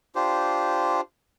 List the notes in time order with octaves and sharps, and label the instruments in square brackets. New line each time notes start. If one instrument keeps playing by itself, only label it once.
[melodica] D4 F4 G4 C5